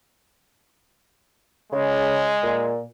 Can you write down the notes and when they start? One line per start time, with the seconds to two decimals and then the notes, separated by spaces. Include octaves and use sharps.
1.72 C#3 G#3
2.43 A#2